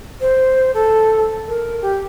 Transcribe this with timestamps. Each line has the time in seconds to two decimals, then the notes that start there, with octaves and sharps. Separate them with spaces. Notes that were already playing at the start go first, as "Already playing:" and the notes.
0.21 C5
0.74 A4
1.48 A#4
1.82 G4